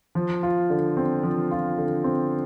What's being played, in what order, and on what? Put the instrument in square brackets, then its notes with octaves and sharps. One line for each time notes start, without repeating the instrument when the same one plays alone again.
[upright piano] F3
F4
D3
C4
F3
F4
D3
C4